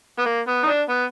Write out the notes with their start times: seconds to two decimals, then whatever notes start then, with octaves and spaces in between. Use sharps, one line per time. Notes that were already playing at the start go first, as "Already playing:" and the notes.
0.19 B3
0.26 A#3
0.48 B3
0.63 D#4
0.67 D4
0.89 B3